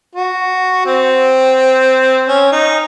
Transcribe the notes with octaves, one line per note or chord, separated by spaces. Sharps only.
F#4
C4
C#4
D#4